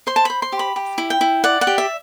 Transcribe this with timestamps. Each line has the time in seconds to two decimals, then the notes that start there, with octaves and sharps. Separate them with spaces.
0.07 C5 C6
0.16 A5
0.25 C5 B5
0.42 C6
0.52 G4
0.59 B5
0.76 G4
0.98 E4
1.10 G5
1.21 E4
1.44 D5 F#5
1.61 F#5
1.67 G4
1.78 E5